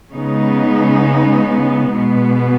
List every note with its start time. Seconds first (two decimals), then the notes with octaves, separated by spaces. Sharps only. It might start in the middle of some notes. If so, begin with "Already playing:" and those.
0.14 C#3 G#3 B3 D#4
1.94 B2 G#3 B3